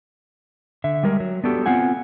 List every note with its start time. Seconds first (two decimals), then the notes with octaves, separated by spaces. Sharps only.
0.84 D3 E5
1.03 G3 G#3 A#4
1.20 F#3
1.44 B3 D4 F#4 G4 A4
1.66 B3 C4 F4 F#5 G#5